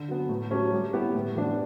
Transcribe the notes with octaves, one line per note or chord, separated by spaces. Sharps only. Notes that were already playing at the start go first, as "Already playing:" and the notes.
Already playing: D3
F#3 B3
A2
F#3 A3 C#4 G4
G3
B3 E4 G4
A2
E3 B3 D4 G4